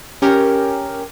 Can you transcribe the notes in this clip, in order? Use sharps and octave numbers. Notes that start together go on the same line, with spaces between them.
C#4 G4 A#4